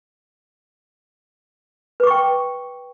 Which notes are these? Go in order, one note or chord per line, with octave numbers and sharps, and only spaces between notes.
B4 G5 C#6 D6